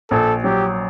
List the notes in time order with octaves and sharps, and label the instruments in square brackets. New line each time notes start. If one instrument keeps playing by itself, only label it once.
[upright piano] A#1 [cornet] A4
[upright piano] F#3 [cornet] G4